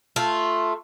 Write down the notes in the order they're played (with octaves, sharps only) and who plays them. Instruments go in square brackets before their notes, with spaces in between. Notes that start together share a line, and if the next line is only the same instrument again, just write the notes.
[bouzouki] A3 F4